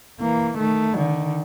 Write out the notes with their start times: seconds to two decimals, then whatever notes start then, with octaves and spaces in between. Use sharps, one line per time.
0.20 E3 A#3
0.58 D#3 A3
0.95 D3 D#3